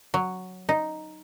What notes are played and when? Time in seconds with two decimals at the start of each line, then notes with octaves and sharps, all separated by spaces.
0.14 F#3
0.69 D#4